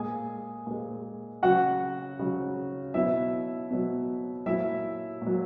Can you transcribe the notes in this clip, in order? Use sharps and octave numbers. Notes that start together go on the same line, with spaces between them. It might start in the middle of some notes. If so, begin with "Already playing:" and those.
Already playing: A#2 G#3 G#4 G#5
A#2 G#3
C#3 F#3 F#4 F#5
C#3 F#3
B2 F#3 E4 E5
B2 F#3
A#2 F#3 E4 E5
A#2 F#3